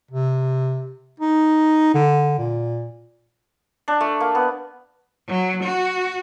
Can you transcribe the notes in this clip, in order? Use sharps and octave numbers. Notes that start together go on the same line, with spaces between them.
C3
D#4
D3
A#2
D4
A3
A#3
B3
F#3
F#4